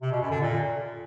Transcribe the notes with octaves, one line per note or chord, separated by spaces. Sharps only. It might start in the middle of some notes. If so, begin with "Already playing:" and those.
C3
B2
F#2
D3
A#2